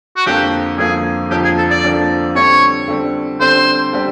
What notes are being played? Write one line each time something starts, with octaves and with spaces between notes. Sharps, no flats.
F#4
F2 D3 F3 A#3 G4
F2 D3 F3 A#3 G#4
F2 D3 F3 A#3 G4
G#4
A4
D5
F2 D3 F3 A#3
D3 G3 C4 C#5
D3 G3 C4
D3 G3 C4 C5
D3 G3 C4